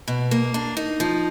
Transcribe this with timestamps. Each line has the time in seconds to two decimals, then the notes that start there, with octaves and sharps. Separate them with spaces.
0.08 B2
0.31 A#3
0.54 D4
0.77 D#4
1.00 F3